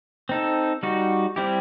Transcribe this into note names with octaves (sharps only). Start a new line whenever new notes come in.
C4 D#4 A4
G3 D#4 F#4
G3 C4 E4 G4